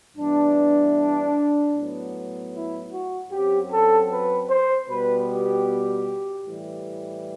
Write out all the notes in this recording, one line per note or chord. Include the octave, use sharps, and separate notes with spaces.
G2 E3 B3 D4
A2 F#3 B3
E4
F#4
F#2 F#3 C4 G4
A4
B4
C5
B2 G3 B3 B4
G4
A2 E3 G3